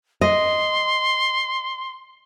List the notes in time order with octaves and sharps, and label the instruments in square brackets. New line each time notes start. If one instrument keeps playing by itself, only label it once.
[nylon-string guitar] D#5 [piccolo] C6